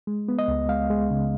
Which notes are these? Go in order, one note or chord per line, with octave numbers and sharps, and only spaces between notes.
G#3
B3
D#5
C#2
G#3 F5
G#3
C#3